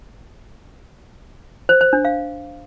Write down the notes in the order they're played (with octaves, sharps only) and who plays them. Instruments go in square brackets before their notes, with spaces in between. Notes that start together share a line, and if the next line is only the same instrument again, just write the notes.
[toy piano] C5
C5
D4
F5